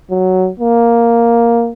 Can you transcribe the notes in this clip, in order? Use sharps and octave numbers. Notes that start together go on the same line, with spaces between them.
F#3
A#3